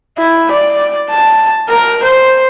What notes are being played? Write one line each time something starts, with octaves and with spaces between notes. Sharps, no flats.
E4
D5
A5
A#4
C5